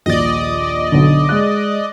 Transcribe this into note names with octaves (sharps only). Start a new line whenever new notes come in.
D#1 A#1 D5 D#5
B1 D3
G#3 F#6